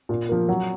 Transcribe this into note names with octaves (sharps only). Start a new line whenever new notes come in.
A#2
F3 A#3
F#3